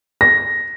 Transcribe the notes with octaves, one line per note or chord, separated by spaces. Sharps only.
A#6